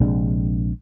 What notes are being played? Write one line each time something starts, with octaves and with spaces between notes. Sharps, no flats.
A#1 C3 G#3 D4